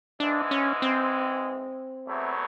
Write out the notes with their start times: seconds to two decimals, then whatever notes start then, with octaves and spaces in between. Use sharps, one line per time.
0.20 G#2 E3 G#3 D4
0.51 C#4
0.82 C4
2.07 E2 B2 F#3 A3